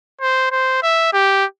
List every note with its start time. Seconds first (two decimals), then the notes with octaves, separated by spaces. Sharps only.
0.21 C5
0.52 C5
0.83 E5
1.13 G4